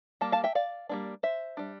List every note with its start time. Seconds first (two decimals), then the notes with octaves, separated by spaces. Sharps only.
0.21 G3 A#3 A5
0.32 F5 A5
0.44 E5 G5
0.55 D5 F5
0.89 G3 A#3 D4
1.23 C5 E5
1.57 G3 D4